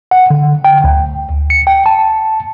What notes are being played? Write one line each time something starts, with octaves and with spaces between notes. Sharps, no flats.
F#5
D3
G5
D2
C#7
G5
A5